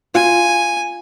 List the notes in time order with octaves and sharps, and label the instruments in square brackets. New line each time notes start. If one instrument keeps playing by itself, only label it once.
[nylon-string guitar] F4 [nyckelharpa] G#5